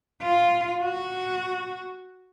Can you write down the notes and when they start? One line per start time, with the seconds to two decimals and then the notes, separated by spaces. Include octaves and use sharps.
0.22 F4
0.84 F#4